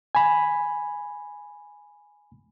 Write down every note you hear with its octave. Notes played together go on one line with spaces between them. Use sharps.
G#5 B5